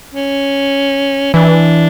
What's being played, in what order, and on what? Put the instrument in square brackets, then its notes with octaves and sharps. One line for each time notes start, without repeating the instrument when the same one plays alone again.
[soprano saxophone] C#4
[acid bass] E3 [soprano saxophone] D4